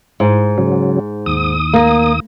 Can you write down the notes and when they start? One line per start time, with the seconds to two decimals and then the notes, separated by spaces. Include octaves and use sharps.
0.20 G#2
0.58 C#3 F#3
1.26 D#2 D#6
1.73 A#3